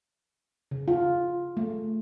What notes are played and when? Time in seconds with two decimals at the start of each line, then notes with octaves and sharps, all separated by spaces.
0.71 C#3
0.88 F4
1.57 A3